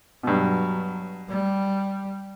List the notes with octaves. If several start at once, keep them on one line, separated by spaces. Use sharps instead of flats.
G2 B2 F#3
G3